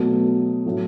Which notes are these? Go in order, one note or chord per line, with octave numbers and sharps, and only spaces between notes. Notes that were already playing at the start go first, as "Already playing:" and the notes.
Already playing: B2 F#3 A3
A2 F#3 A3